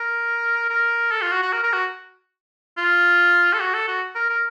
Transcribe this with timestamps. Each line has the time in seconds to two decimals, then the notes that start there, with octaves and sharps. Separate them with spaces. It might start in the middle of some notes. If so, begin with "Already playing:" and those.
Already playing: A#4
0.70 A#4
1.11 A4
1.22 F4
1.32 F#4
1.42 F#4
1.53 A#4
1.63 A#4
1.73 F#4
2.77 F4
3.53 A4
3.60 F#4
3.74 A4
3.88 F#4
4.15 A#4
4.29 A#4